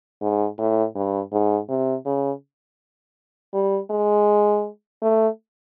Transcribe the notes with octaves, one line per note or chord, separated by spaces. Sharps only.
G#2
A2
G2
G#2
C3
C#3
G3
G#3
A3